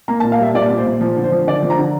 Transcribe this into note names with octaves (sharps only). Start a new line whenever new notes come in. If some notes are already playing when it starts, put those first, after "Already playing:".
A#3 A#5
A5
A#2
F5
G3 E5
A#2 D5
A#2
C5
A#2
F3
D3
C5
F3
D3 D5
F3
A#5
D3